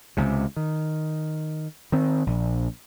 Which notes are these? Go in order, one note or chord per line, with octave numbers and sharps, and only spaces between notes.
C#2 C3
D#3
D#3 C4
A#1